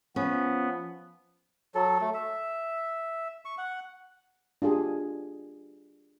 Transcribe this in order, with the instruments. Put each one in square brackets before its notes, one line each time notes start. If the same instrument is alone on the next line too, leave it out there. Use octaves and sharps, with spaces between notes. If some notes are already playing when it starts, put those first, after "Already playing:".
[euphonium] F3 [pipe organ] B3 [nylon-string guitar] C#4
[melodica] F#3 A4
A3
E5
C#6
F#5
[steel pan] D4 F4 G4 G#4